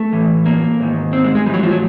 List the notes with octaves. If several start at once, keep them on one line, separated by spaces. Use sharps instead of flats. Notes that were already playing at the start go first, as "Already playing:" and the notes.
Already playing: A3
A2 E3
A#3
G#2 D#3
C4
G#3
G#3
A2 E3 F#3 G3
F3
F#3